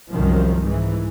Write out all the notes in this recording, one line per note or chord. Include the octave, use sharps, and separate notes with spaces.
C2 F#2 D#3 F3
G#2 E3